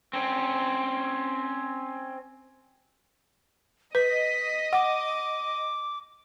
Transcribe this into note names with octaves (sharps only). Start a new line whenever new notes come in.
C4 C#4
B4 D#5 B6
F#5 D6